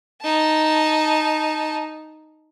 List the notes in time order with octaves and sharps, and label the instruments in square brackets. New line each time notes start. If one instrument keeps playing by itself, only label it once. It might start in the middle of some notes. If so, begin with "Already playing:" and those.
[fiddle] D#4 A5